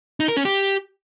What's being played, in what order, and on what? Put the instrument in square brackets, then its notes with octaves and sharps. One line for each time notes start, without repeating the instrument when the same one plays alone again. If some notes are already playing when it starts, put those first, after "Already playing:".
[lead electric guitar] D#4
A#4
C#4
G4